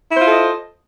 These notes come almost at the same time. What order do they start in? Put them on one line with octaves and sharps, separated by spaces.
E4 C5 F4 A4 D#5